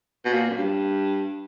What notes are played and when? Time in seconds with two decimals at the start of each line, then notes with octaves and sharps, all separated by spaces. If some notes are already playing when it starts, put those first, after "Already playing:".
0.25 B2
0.33 A#2
0.50 F#2
0.57 G2